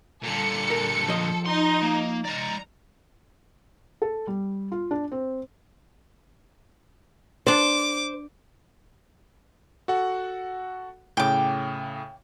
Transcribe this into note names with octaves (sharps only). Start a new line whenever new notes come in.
A#2 D3 G3 A4 C#7
A#4
F3 D#5
D#4 C6
A#3
G#3 D5 A#5
A4
G3
F4
D4
C4
D4 C5 D5 D6
F#4 A4 F#5
A2 C#3 G5 D6